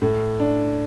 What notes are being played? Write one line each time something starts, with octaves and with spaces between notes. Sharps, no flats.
A2
D4